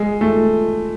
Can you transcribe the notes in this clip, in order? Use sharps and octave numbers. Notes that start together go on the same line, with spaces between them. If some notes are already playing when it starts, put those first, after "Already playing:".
Already playing: G#3
A3